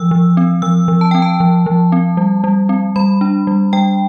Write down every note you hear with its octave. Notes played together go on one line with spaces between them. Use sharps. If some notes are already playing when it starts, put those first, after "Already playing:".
Already playing: E3 F3 E6
F3
C4
F3 E6
F3
A5
C4 G5
A5
F3
F3
C4
G3
G3
C4
G3 B5
D4
G3
G3 G5